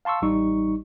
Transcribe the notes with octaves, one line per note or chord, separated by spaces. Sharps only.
F5 A5 C6 C#6 E6
A1 G3 D#4 C#6